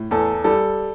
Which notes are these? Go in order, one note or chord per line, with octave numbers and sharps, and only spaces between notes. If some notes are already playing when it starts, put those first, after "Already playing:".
Already playing: A2
E2 A4
G3 A4